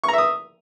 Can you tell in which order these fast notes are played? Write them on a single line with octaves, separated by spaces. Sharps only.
C#6 A#5 E5 D#6